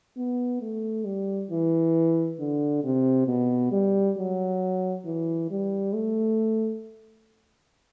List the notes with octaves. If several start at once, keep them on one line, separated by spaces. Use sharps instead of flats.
B3
A3
G3
E3
D3
C3
B2
G3
F#3
E3
G3
A3